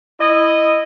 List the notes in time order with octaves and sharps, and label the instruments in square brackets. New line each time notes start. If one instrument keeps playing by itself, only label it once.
[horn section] E4 D#5